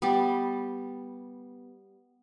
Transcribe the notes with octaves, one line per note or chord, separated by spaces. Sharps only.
G3 B3